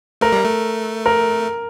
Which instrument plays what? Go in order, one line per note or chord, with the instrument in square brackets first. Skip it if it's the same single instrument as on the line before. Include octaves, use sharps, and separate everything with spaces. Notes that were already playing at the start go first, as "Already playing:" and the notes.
[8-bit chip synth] A3 [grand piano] A#4
[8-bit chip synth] G3
A3
[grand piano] A#4